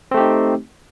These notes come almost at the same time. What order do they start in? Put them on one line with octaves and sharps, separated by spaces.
C4 A3 G4 D#4